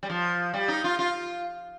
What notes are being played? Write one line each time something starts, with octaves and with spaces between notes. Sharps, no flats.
G3
F3
G3
D#4
F4
F4